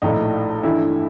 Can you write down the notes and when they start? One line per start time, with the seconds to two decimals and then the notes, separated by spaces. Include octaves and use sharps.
0.02 A#1 A2 F3 A3 D#4
0.63 G2 E3 A3 E4